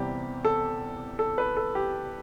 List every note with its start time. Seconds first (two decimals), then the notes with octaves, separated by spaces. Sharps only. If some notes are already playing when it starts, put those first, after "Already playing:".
Already playing: E2 C3 G3 G4
0.45 A4
1.19 A4
1.38 B4
1.57 A4
1.75 G4